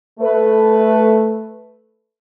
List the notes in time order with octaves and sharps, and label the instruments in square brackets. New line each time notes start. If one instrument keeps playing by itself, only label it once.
[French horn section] A3 B4